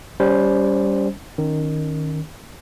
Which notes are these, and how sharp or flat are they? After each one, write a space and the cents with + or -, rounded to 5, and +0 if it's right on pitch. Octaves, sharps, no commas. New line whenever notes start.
G3 +0 C#4 +30 C5 +0
D#3 -10 C#4 +0